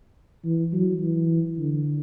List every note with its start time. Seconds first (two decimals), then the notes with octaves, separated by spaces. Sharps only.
0.45 E3
0.73 F#3
1.01 E3
1.58 D3